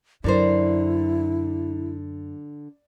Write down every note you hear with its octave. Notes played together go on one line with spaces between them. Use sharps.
F#2 D3 E4 A#4 C5 D5